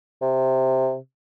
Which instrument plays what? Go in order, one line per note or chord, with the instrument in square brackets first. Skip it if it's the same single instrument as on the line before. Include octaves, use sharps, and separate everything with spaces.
[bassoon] C3